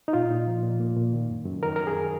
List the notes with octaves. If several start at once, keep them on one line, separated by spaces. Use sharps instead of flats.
D#4
A#2 F4
A#2
F3
A#2
A#3
A#2
D#3
F#2
F#2
D#3 A#4
F#2 A#4
G#4